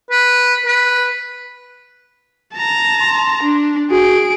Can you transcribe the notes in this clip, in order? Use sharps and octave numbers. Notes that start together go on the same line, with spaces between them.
B4
B4
A5 A#5
C6
D4
F#4 G#4 D7